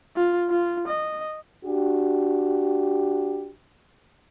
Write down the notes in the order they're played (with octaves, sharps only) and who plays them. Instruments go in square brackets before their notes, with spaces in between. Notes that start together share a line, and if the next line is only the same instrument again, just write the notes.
[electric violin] F4
F4
D#5
[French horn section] D4 F#4 G4